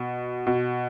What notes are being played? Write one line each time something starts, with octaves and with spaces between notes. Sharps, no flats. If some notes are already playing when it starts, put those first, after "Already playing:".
Already playing: B2
B2